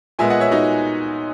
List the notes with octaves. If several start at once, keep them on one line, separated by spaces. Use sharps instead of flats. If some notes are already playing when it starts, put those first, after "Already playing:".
A#2 G#3 B3 E5 G#5
D#5 F#5
C#5 E5
D#4 F#4